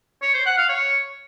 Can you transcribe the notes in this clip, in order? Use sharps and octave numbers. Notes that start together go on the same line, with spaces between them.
C#5
C5
F#5
F5
C#5